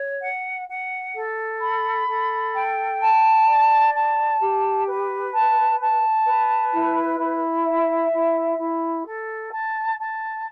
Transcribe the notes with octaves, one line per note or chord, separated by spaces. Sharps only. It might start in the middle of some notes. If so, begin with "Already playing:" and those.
Already playing: C#5
F#5
F#5
A4
B5
A4
G5
A5
D5
A5
G4
B4
A5
A5
B4
E4
E4
E5
E4
E4
A4
A5
A5